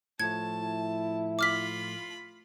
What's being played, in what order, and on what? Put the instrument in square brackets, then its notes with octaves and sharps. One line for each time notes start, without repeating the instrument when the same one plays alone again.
[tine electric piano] A2 F3 A3 [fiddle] A5 [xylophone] G#6
[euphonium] E4
[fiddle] F4 B5 [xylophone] D6 F6 B6